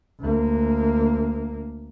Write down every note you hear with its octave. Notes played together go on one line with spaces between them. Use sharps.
D2 A#3